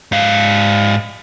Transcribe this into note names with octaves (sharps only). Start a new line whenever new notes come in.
G#2 F5